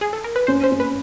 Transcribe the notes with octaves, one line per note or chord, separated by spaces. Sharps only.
G#4
A4
A#4
B4
C#4 C5
C5
C#4
B4